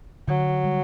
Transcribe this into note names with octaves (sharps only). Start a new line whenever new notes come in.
D3 F#3
G3